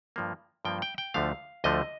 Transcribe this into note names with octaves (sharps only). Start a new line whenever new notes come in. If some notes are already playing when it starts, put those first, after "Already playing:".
G2 F3 A#3
G2 F3 A#3 G5
G5
G5
D2 D3 F3 A3 F5
D2 D3 F3 A3 D#5